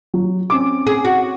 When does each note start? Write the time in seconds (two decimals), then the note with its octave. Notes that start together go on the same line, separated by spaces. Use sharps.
0.14 F#3
0.50 C4 C#4 D6
0.87 G#4
1.05 F#4